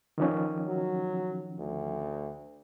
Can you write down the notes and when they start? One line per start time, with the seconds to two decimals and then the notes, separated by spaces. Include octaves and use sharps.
0.18 D#3 F3 C#4
0.67 F#3
1.59 D2